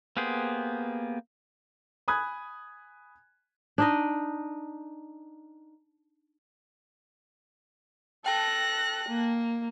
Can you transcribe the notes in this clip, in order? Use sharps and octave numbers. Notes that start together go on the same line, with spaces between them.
A#3 B3 G4 G#4 C5
G#5 B5 D#6 F#6 G#6
D4 D#4 D#5
A4 G5 A5 F#6 A#6
A#3